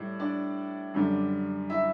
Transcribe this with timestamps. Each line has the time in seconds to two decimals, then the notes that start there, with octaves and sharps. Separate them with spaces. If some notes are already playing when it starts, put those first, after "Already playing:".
Already playing: A2 G3
0.19 D4 D5
0.94 F#2 D3 G3
1.70 E4 E5